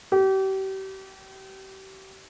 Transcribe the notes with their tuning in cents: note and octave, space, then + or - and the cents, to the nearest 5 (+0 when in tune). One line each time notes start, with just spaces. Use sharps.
G4 -35